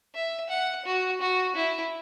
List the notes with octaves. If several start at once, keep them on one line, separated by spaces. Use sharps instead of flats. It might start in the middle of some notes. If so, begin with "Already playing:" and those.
E5
F#5
F#4
F#4
E4